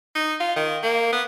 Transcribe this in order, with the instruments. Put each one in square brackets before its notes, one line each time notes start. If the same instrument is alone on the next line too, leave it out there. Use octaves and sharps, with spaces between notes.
[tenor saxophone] D#4
F4
D#3
A#3
B3